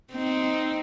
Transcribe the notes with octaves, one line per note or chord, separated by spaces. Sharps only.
C4 D#4